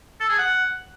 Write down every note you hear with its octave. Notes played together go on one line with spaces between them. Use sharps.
A4
G#4
F#5